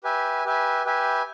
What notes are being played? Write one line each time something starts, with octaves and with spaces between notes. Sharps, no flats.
G4 B4 E5 G#5
G4 B4 E5 G#5
G4 B4 E5 G#5